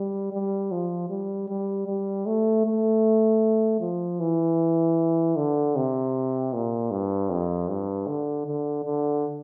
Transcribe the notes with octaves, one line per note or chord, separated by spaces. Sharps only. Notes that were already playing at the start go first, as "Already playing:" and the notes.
Already playing: G3
G3
F3
G3
G3
G3
A3
A3
F3
E3
D3
C3
A#2
G2
F2
G2
D3
D3
D3